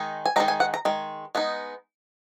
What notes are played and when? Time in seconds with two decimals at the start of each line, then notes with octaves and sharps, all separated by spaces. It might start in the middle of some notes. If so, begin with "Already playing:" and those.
Already playing: D#3 G#3 D#4
0.26 G#5
0.36 D#3 G#3 D#4 A#5
0.48 G#5
0.60 F#5
0.74 A#5
0.85 D#3 G#3
1.35 G#3 B3 D#4